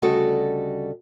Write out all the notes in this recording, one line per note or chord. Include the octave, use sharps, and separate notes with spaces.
D2 C#3 G3 F#4 A4 D#5